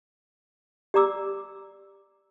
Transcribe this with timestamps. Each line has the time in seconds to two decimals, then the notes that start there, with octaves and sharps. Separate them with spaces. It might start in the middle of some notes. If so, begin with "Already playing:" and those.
0.94 G4 D5 A#5 D6 E6